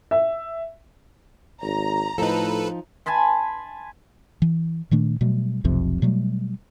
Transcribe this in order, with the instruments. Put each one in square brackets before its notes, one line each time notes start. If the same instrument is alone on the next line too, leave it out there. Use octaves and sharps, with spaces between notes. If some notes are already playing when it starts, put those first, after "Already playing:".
[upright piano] E5
[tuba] G#1 [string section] A#5
[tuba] A2 [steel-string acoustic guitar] F3 D#4 [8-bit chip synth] A4 B4
[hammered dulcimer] G#5 A5 B5 C6
[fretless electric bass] E3
A#2 D#3 A3 D4
B2 F#3 G3 A3
F1 B1 F2 C3
B2 F#3 G3 A3